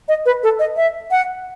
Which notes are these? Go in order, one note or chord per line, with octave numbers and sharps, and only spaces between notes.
D#5
B4
A4
D#5
E5
F#5